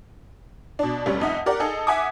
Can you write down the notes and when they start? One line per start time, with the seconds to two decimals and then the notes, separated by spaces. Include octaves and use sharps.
0.79 B2 D4
1.06 F1 G3 C#4
1.20 F2 D#4 E5 F#5
1.46 G4 A#4 D5 F#5
1.60 D#4 G#4 A4
1.87 E5 F#5 G#5 D6 D#6